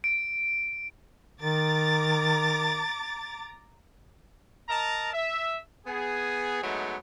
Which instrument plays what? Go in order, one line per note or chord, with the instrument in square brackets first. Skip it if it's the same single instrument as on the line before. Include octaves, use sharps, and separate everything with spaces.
[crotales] D7
[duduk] D#3 [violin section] A#5 D6 A6
[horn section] A#4 D#5 A5 A#5
E5
B3 G#4
F#3 G#3 A3 B3 D#4